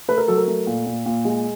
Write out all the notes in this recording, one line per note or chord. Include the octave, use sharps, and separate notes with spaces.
A3 B4
A#4
F#3 A4
A#4
A3
A#2
A#2
A#2
G#3